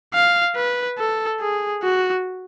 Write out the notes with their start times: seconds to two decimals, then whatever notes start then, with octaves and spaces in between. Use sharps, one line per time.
0.14 F5
0.56 B4
0.98 A4
1.40 G#4
1.83 F#4